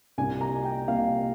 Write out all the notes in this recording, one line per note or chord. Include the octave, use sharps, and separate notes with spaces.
C2 A#2 G3 A#3 G#5
A#5
G5
C2 A#2 G3 A#3 F5